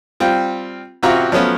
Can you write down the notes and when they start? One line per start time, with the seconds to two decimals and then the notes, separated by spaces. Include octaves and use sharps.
0.20 G3 C4 F4
1.03 A1 C3 C4 F4 F#4 A#5
1.32 F3 F#3 A3 B3 C#4 F4